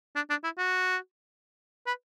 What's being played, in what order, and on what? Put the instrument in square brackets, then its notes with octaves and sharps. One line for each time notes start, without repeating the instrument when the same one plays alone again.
[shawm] D4
D4
E4
F#4
B4